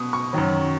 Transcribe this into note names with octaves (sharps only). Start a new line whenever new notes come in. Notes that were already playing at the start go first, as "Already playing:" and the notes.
Already playing: B2 C#6 D#6
C#6
F#2 D#3 F#3